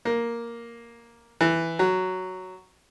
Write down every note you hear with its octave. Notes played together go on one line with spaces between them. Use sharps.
A#3
E3
F#3